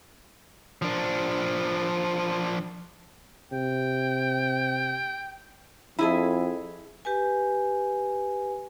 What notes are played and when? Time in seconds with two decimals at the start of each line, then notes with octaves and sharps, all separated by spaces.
0.82 F3 D4
3.52 C3 G5
5.99 F2 E4 G#4 A4
7.05 G4 B4 G#5